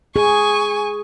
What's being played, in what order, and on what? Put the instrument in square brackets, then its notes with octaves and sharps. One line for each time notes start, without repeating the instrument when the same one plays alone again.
[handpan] G#4 [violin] G#5 C#6